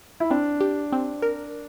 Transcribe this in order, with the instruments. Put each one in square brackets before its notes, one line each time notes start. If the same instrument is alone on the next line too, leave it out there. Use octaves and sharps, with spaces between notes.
[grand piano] E4
[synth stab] C4 [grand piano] D4
[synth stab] G4
C4
A#4